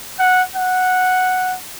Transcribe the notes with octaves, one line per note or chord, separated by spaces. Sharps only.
F#5
F#5